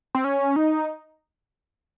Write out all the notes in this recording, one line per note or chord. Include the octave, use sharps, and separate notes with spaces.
C4
C#4
D#4